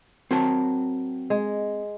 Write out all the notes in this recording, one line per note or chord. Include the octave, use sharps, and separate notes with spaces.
F#3 C4 A#4 A5
G#3